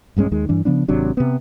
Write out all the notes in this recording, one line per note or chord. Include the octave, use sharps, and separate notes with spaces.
A#1 G2 G#3 C#4
D#2 D#3 G#3
G2 E3 D4
C#3 F3 B3 D4
G#1 C3 F#3 D4
C3 B3